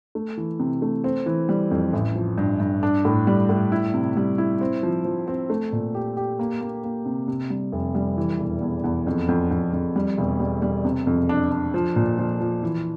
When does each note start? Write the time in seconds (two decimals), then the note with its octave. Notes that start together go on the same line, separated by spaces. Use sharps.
0.15 A3
0.37 E3
0.60 C3
0.82 A3
1.04 C4
1.26 E3
1.49 G3
1.71 F2
1.93 A1
2.15 F3
2.38 G2
2.60 G2
2.83 D4
3.05 A2
3.27 G3
3.49 A2
3.72 E4
3.94 C3
4.17 G3
4.38 E4
4.61 C4
4.83 F3
5.05 F3
5.28 C4
5.50 A3
5.72 A#2
5.95 G4
6.17 G4
6.39 A#3
6.61 A#3
6.84 A#3
7.06 C3
7.28 C3
7.50 G3
7.72 F1
7.95 G3
8.17 E3
8.39 E1
8.61 E2
8.84 E2
9.07 F2
9.28 F2
9.51 F2
9.73 F2
9.96 G3
10.18 E1
10.40 G3
10.62 G3
10.85 C3
11.07 F2
11.29 D4
11.52 D4
11.74 F3
11.96 A#2
12.18 F3
12.40 F3
12.63 E3